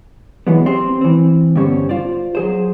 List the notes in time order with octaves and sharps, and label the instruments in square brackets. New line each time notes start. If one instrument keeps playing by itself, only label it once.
[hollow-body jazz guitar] E3 F#3 G#3 B3
C4 G4 C5
E3 C4
G2 D3 B3 C#4 C5 C#5
F4 C5 D5
F#3 G#4 C5